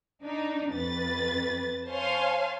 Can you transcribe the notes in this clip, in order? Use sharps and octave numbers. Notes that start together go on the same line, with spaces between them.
D4 D#4
F2 B4 A6
C5 C#5 F5 G#5 A5 C6